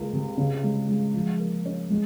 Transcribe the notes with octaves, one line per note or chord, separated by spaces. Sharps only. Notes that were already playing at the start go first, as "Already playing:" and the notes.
Already playing: C#2 A#3
C3
C#3
G#3
G#3
F3
A#3
C#4
G#3